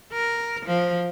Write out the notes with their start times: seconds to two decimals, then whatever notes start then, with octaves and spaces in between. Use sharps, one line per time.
0.13 A#4
0.66 F3